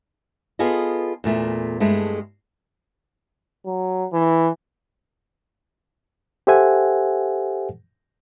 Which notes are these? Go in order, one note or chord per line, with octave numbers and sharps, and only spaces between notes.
B3 F4 G#4 A4 D#5
E2 A#2 A3
G2 G#3 A3
F#3
E3
G4 A4 C5 E5 F#5 G#5